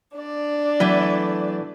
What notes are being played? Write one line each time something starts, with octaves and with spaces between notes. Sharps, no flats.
D4 D5
E3 F#3 A3 B3